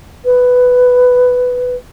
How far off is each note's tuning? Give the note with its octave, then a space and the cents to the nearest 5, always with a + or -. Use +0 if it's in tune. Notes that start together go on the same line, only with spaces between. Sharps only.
B4 +10